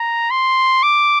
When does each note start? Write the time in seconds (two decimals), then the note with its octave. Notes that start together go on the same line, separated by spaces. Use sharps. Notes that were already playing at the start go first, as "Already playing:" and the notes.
Already playing: A#5
0.31 C6
0.83 D6